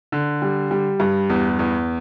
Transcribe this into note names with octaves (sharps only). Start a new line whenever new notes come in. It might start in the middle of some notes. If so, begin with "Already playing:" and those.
D3
G3
G3
G2
E2
E2